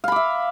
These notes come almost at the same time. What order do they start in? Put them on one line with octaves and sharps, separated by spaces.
F5 B5 D6 E5